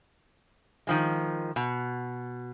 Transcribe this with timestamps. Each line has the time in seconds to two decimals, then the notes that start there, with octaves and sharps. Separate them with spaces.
0.87 D#3 F3 G#3
1.56 B2